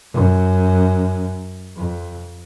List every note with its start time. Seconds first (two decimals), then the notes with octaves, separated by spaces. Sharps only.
0.13 F#2
1.76 F2